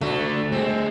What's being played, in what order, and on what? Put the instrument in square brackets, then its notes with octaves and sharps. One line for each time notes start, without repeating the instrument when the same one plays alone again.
[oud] D2 [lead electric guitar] D3 F#4 [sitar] A3
[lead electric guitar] A3 G#4 [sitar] C4